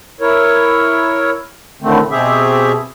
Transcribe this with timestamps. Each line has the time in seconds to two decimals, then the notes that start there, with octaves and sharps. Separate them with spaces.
0.21 E4 A#4 C#5
1.82 A2 D3 D#3 A3 C4
2.11 B2 C4 G4 G#4 E5